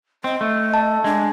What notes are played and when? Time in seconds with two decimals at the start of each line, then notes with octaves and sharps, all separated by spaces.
0.24 C4 D#5
0.41 A3
0.74 A5
1.04 G#3 D4